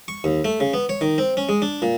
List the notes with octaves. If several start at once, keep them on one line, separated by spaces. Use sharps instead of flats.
C#6
D#2
A3
C#3
B3
C#5
D#3
C4
C#4
G#3
D4
A#2